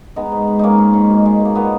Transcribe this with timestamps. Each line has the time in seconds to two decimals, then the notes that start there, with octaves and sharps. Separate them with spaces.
0.16 G#3 B3 D#4
0.32 G#2
0.48 G#2
0.59 G#3 A#3 C#4 D#4
0.78 G#2
0.93 G#2
1.10 B2
1.26 G#3
1.40 B2 A#3
1.55 A#2 B3